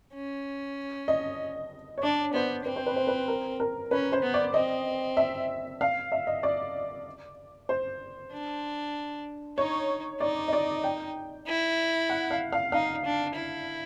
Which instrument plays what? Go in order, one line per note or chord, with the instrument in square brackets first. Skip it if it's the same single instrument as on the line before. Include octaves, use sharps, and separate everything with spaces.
[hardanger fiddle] C#4
[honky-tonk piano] D#5
C#5
[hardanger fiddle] D4 [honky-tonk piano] D5
[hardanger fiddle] B3 [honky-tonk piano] C5
[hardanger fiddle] C4 [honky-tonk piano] B4
[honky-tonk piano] C5
B4
C5
B4
A#4
A#4
[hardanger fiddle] C#4 [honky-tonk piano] B4
[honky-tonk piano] C5
[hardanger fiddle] B3
[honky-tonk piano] D5
[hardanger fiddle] C4 [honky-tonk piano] D#5
[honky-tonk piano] E5
F5
E5
D#5
D5
C5
[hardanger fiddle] D4
[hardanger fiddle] D#4 [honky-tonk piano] C#5
[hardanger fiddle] D#4 [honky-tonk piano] D5
[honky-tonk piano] D#5
D5
G5
[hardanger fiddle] E4
[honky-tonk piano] F#5
F5
F5
[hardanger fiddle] D#4 [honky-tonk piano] F5
[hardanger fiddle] D4
E4